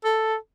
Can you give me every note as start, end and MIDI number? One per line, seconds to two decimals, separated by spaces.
0.04 0.35 69